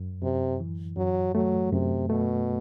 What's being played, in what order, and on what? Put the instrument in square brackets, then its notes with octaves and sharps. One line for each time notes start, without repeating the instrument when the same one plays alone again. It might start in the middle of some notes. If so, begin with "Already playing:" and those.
Already playing: [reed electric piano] F#2
[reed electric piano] F#2 [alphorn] C3
[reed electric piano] E3
[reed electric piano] F#2 [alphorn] F#3
[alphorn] F#3 [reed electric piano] A3
[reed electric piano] F#2 [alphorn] C3
[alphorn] B2 [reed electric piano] A3